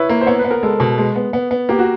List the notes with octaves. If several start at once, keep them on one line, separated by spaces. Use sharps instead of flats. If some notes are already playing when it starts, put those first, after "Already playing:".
Already playing: E4 B4 C#5
A#3
C5
B3 C#5
B4
B3
A#4
G#3 A4
B2
G#3
B3
B3
B3
A#3 G4
F#4